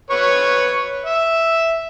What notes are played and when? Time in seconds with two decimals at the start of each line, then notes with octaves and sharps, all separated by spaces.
0.11 B4 C#5 C#6
1.06 E5